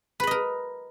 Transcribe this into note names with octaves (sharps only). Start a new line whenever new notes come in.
A#4 B4 D#5 B5